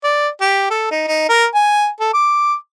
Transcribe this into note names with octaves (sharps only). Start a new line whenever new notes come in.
D5
G4
A4
D#4
D#4
A#4
G#5
A4
D6